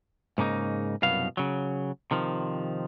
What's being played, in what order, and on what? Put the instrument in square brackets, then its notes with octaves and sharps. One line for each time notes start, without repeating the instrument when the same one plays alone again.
[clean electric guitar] G#2 C#3 A#3 D#4
C2 F#2 B2 B3 F5
C#3 F#3
C3 D#3 F3